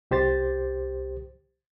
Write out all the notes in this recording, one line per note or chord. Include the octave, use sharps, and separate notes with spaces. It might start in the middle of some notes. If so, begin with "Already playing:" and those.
C2 G4 C5 A6